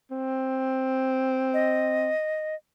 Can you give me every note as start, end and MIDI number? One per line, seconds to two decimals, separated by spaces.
0.11 2.10 60
1.54 2.55 75